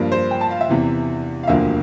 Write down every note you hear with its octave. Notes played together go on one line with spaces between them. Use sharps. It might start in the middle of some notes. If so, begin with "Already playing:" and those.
Already playing: G2 F3 A#3 D4
C5
G5
A5
F5
E5
E2 C3 E3
F5
E1 D2 D3 F3 A#3 E5